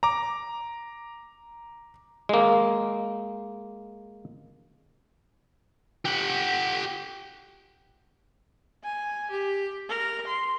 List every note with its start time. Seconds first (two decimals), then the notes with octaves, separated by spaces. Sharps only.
0.03 A#5 D6
2.29 G#3 A#3
6.05 G4 F#5
8.84 G#5
9.30 G4
9.89 A#4
10.27 C6